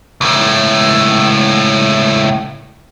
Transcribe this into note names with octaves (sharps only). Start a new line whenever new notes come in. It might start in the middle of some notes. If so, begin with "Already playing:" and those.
C#2 A2